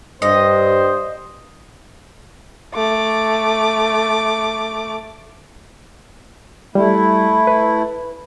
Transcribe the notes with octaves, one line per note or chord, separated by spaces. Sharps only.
G2 C5 D#5
A3 D6
G3 A3 E4
B4